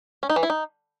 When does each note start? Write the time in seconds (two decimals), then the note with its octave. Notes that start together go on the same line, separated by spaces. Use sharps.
0.23 C#4
0.30 D#4
0.36 E3
0.43 E4
0.50 D#4